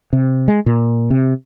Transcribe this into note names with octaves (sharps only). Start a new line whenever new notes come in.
C3
G#3
A#2
C3